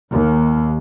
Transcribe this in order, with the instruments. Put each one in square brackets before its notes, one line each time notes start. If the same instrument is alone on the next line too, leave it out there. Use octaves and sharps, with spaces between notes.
[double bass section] D#2